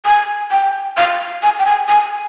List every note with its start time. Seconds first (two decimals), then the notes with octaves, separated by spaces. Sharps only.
0.06 G#5
0.51 G5
0.97 F5
1.43 G#5
1.59 G5
1.66 G#5
1.89 G#5